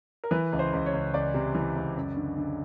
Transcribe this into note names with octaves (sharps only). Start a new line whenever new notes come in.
A#4
E3 B4
C#2
C5
C#2
C#5
C#2
C#2 D5
C3
E3
C#2
F#2
D3
D3